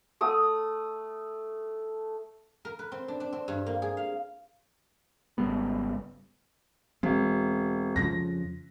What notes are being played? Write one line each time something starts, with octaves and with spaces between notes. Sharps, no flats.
A3 D#6
A#4
B4
C4
D4
D4
C4
G2
A#3
G#4
F5
G#1 C#3 G3 B3
E1 C4
F2 C#3 F3 A#6